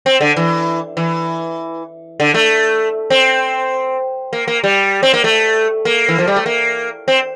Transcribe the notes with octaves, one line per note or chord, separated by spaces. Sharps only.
C4
D3
E3
E3
D3
A3
C4
A#3
A#3
G3
C4
A#3
A3
A#3
E3
F3
G3
A3
A#3
C4